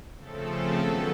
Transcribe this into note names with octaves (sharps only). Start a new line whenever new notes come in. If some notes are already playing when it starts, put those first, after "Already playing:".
C#3 F3 A3 C4 A4
G#4
D#3 F#3 B3 A4